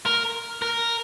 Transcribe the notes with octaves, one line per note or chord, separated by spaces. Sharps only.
A#4
A#4